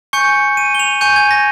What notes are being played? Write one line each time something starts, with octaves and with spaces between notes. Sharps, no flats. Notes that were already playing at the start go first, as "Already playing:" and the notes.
G#5 C#6 G6 C#7
D#7
G7
F7
G#5 C#6 G6 D#7
G#6
A#6